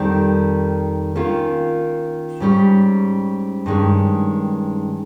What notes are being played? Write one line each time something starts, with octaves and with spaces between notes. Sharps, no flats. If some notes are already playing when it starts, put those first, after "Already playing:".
Already playing: F2 D#3 G3 C4
D#3 A#3 C#4 F4
G#2 G3 C#4
G2 D#3 G#3 C#4